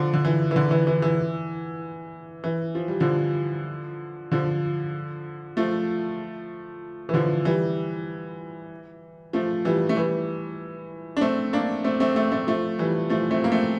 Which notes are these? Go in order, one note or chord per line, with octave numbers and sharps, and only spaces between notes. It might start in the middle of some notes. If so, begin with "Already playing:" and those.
Already playing: D3 F3
D3
E3
E3
D3
E3
E3
E3
E3
F3
G3
D3 F3
D3 F3
F3 A3
E3
D3 F3
E3 G3
F3 A3
E3 G3
A3
E3 G3
D4
A3 C4
A#3 D4
A3 C4
A3 C4
A3 C4
A3 C4
F3 A3
E3 G3
F3 A3
A3 C4
A#3
A3 C4